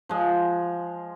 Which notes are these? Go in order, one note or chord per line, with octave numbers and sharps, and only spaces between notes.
F3 G#3